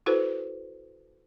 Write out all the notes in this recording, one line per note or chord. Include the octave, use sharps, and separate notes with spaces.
E4 F#4 A4 B4 C5